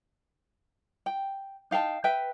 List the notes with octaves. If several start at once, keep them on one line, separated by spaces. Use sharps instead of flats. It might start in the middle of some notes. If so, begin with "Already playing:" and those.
G5
D#4 F5 G5 A5
B4 E5 G5